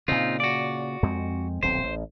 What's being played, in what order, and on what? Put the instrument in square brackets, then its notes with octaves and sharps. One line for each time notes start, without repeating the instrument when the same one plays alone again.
[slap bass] A#2 C#3 [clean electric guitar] C4 D#4 F4
[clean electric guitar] F#4 D5
[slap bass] F2 G#3 C4
[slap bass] D#1 B1 C4 [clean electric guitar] C5
[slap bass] A1